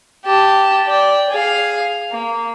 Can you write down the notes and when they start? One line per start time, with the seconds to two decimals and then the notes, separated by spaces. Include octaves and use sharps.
0.25 G4 A5
0.86 D5 G5
1.30 G#4 F5
2.12 A#3